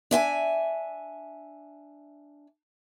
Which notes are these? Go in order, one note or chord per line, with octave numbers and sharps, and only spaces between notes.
D4 E5 G5 G#5